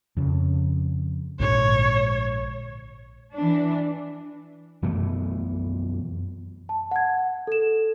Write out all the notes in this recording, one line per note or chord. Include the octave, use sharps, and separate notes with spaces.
F2 C#3
A#1 G#2 D3 C#5
E3 D4
F#2 B2 E3 A3
A5
F#5 G#6
A4 E7